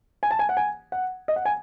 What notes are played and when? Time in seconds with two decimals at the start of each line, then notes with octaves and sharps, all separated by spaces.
0.23 G#5
0.31 A5
0.39 G#5
0.49 F#5
0.57 G#5
0.92 F#5
1.28 D#5
1.36 F#5
1.45 G#5